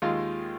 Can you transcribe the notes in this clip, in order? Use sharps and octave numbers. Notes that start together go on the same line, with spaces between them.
D#2 D#3 G#3 F4